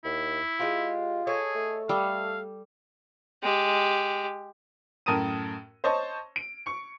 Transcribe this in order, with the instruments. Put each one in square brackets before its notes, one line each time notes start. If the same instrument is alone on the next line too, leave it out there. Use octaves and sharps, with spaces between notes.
[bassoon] D#2 [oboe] E4
[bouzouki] G#3 G4 [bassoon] F4
[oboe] G#4 [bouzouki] A4 C#5 D#5
[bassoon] A3
[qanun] G3 [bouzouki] A4 [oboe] F5
[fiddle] G#3 G4
[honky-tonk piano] F#2 A2 A#4 A5 D#6 D#7
C5 C#5 D#5 A5 C#6
D7
C#6 C#7